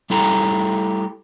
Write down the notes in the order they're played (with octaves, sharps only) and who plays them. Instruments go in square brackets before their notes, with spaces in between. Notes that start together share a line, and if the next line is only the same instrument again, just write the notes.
[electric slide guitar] G3 A3 E4 G4 A4 A#5